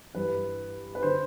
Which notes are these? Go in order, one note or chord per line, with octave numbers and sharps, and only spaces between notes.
G2 E3 B4
B4
D3 C5